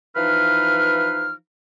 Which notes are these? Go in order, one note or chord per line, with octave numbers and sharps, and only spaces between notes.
E3 F3 D#4 B4 F5 F6